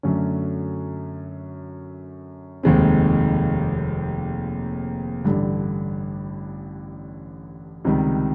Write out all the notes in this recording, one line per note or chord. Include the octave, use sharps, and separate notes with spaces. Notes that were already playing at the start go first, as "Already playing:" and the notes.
F#2 D3 F#3 A3 C#4
F1 D#2 D#3 G#3 C4
A1 G2 D3
C#2 C3 D#3 G3